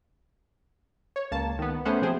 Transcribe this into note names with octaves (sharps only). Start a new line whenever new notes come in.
C#5
C#2 A#3 A5
D#3 B3
A3 B3 C#4 C5 F#5
C3 F3 C4 G#4 C5